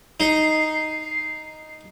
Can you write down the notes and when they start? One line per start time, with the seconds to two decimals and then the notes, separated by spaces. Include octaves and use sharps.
0.20 D#4 C7